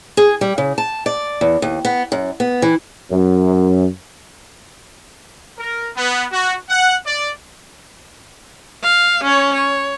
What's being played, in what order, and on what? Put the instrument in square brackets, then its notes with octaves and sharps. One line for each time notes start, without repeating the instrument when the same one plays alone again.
[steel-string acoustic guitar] G#4
G3
C#3
A5
D5
E2
D#2
B3
F#2
B3
E3
[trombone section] F#2
[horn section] A#4
B3
F#4
F#5
D5
[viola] F5
C#4 C#5
C#5